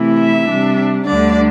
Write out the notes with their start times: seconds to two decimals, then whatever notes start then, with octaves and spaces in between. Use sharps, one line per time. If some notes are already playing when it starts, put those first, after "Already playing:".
Already playing: C3 E3 A3 E4
0.19 E5
0.48 C3 G3 D4
1.05 D2 D3 G3 D4 D5